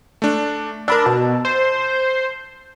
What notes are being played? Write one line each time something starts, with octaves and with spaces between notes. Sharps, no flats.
A3 D4
D4 A#4 B5 E6
B2 A5
C5